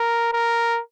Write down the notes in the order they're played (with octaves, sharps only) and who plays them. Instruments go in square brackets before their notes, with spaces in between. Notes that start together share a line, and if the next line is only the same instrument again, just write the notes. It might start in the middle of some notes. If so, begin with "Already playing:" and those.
Already playing: [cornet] A#4
A#4